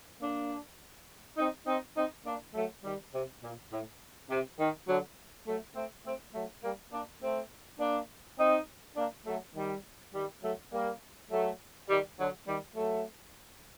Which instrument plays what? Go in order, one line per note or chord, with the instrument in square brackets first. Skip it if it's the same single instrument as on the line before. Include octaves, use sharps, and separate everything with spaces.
[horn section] A#3 D4
C4 D#4
C4 D#4
C4 D#4
A#3 D4
F#3 A3
D#3 G3
C3
A#2
A2
C3
D#3
D3 F#3
F#3 A3
A3 C4
A3 C4
F#3 A3
G3 A#3
A#3 D4
A3 C4
A#3 D4
C4 D#4
A#3 D4
F#3 A3
D#3 G3
D#3 G3
F#3 A3
G3 A#3
F#3 A3
D#3 G3
D3 F#3
D#3 G3
F#3 A3